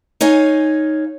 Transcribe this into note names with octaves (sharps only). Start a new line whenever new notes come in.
D#4 C#5 F5 G#5